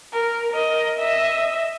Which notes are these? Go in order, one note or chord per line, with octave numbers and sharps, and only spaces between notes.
A#4
A#4 D#5
D#5 E5